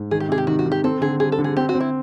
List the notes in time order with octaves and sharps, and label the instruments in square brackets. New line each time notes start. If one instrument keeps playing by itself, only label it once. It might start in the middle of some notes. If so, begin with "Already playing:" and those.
Already playing: [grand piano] G#2
[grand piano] D#3 [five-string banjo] G#4
[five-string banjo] G4
[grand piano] C3 [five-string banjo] G#4
[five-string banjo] G4
[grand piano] D#3 [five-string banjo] F#4
[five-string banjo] F#4
[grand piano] D#3
[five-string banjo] G4
[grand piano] C4 [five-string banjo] A4
[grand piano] D3 [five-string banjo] G#4
[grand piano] G3 [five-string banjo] G#4
[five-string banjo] A4
[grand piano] D3
[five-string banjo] G#4
[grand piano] C4 [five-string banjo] G4
[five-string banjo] F#4
[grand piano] C4
[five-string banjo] E4